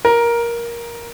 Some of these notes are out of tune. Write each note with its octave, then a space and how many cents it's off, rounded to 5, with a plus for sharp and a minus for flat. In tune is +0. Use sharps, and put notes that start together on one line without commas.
A#4 +10